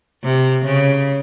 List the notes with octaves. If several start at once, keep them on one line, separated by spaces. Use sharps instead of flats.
C3
C#3